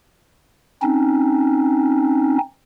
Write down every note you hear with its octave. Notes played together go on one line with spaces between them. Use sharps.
C4 C#4 D#4